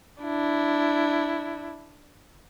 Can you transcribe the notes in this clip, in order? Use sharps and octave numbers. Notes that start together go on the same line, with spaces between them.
D4 E4